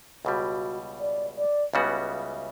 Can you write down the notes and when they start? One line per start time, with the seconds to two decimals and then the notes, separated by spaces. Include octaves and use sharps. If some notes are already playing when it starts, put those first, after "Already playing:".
0.25 C#2 B2 G3 F#4
1.00 D5
1.37 D5
1.74 C#2 C#3 G3 B3 F#4 E5